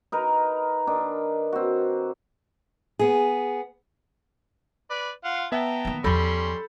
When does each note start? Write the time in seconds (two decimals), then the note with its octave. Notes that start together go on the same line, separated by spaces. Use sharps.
0.12 D#4 A#4 B4
0.87 D#3 D4
1.52 C4 F#4
2.99 B3 G#4
4.90 B4 D5
5.24 F4 F5 F#5
5.52 B3 E5 G5 A5 A#5
5.85 D#3 A#3
6.04 E2 F3 G3 C#4 A4 B5 C6 G6